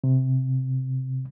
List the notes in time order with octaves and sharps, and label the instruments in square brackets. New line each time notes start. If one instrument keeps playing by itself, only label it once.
[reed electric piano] C3